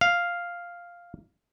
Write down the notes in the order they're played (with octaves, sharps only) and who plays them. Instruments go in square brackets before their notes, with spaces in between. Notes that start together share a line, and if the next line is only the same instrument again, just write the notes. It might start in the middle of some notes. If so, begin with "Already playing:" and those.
[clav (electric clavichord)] F5